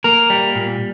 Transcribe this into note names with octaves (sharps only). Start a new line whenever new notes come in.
A#3 A#4
G3
A#2